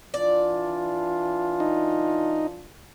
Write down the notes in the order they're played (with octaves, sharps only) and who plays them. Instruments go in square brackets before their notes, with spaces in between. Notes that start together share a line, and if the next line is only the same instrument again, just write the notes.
[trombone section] E3 D4 F4 [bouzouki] D5
[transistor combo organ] D#4